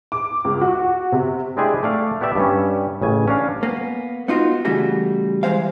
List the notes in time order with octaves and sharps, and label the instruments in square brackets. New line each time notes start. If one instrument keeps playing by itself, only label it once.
[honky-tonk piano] D6
C#2
F#4
C3
[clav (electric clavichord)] G#3 C4 D4 E4 G4 G#4
A3 D5 F5
B3 G4 D5 E5
G2 G3 C#4
A1 C#3 G#5
C#4 D4 F5
[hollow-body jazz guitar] A#3 B3
B3 D#4 F4 F#4
C#3 E3 G3 A3 F#4
E3 F#3 G#3 C5 F5